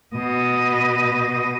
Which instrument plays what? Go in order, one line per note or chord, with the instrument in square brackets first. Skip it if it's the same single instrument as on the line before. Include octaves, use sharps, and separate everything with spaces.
[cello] B2 D#5